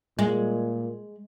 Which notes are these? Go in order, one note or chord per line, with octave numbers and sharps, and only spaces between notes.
A#2 G#3